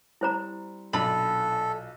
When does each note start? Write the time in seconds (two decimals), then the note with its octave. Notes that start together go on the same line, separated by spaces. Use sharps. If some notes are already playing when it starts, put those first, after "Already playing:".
0.21 G3 C4 E4 C5 A#5
0.93 B1 A#2 D4 F4 A4 B5